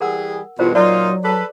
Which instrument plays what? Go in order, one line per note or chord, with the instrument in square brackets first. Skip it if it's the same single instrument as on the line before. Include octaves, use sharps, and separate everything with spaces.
[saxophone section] E3 G3 G#4 [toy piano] A#4 F#5 E6
[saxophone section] E2 G2 B2 [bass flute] F4 [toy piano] A#4 C5 D#5
[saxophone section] A#2 D#4 F4 [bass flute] F#3 [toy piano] D5
[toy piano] G#4 [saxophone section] A4 B4